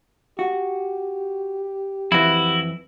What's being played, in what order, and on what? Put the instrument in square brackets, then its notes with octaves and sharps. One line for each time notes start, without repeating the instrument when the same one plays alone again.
[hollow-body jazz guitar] F#4 [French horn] G4
[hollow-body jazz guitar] F2 E3 [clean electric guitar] E4 F#4